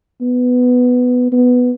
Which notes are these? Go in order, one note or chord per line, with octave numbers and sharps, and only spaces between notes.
B3
B3